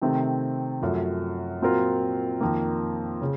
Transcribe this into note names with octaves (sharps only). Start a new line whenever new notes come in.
C3 D#3 A3 C4
F#2 F3 A3
A#2 F#3 C4 F4 A#4
F2 D#3 A#3
C#3